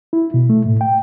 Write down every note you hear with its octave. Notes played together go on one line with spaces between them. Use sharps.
E4
B2
A3
A2
G5